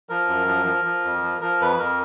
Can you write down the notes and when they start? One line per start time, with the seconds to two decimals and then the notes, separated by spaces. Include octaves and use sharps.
0.09 F3 A#4
0.28 F#2
0.47 F3
0.66 F3
0.85 F3
1.04 F2
1.23 F3
1.41 F3 A#4
1.60 F2 B4
1.79 F2 A#4